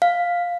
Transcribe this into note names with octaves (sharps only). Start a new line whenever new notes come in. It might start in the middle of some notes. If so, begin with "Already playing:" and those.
F5